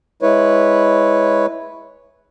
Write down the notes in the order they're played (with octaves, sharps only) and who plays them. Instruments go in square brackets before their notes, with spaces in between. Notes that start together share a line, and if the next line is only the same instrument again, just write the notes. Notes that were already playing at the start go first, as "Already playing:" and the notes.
[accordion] G#3 E4 B4 C#5